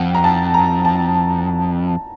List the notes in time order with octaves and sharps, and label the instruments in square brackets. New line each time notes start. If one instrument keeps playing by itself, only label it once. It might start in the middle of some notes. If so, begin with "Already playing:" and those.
Already playing: [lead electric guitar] F2 [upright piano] F#5 G5
[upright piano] A#5
A5
A#5
A5